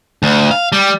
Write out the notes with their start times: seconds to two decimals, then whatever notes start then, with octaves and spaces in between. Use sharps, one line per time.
0.23 D2
0.51 F5
0.72 G3